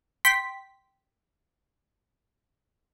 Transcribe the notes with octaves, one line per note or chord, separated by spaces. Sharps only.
G5 C6 B6